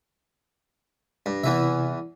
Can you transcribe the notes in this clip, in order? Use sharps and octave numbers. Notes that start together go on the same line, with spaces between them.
G2
E2 C3 E3 E4 E5